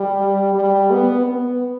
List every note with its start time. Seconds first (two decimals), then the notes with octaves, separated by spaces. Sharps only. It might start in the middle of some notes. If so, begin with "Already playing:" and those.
Already playing: G3
0.55 G3
0.91 B3
1.27 B3